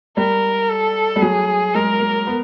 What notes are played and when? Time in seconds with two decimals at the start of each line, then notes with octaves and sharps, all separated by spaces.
0.17 G3 A#4
0.69 A4
1.16 G3
1.22 F#3 G#4
1.74 G#3 A#4
2.00 A#3
2.27 B3